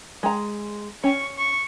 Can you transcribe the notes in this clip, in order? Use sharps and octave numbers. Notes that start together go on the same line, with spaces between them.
G#3 A#5
C#4 C#6
C#6